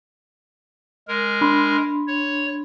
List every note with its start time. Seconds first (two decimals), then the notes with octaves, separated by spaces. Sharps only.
1.08 G#3 A#4
1.41 D4 B5 C6
2.07 C#5